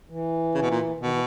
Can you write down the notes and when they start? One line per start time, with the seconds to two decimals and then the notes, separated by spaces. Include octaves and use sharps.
0.09 E3
0.55 C#3
0.62 B2
0.70 A#2
1.01 B2 D#3
1.10 E3